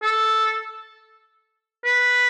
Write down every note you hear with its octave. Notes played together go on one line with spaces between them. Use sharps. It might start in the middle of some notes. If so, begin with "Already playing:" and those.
A4
B4